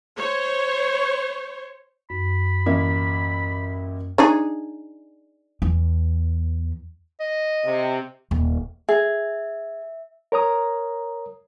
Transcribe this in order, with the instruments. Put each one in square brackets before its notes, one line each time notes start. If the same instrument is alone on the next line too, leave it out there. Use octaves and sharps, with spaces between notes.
[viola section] C5 C#5
[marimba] F#2 [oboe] B5
[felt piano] A1 A#3 E4
[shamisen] D4 D#4 G#4
[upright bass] E2
[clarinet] D#5
[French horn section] C3
[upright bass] D#1
[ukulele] G#4 [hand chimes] E5
[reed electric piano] A#4 C#5 A#5 D#6